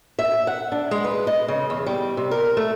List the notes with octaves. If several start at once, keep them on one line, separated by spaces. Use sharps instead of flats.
E5
F#5
D4
G#3
B4
D#5
C#3
E2
G3
C3
A#4
A3